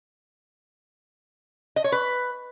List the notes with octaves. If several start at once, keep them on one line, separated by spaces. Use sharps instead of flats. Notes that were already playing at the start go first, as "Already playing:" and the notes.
D#5
C#5
B4